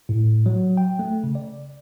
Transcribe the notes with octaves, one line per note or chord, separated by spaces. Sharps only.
A2
F#3
G5
A3
C#3
D5